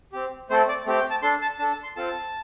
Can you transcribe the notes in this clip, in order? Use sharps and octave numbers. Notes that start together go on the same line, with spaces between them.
C4 G4
A3 C4 A4 C5
D5
A3 C4 G4
G5
A5
D4 A4 C6
A5
D4 A4 A5
A5
C6
C4 F4 A4 A5